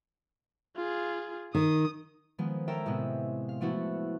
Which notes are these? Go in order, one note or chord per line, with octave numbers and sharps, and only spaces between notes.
F4 G#4
D#3 D#6
D#3 F3 G#3 B3
A4 A#4 C#5 E5 G5 A#5
A2 C3 G#3 B3 C4
F5
F3 A3 B3 E4 F#4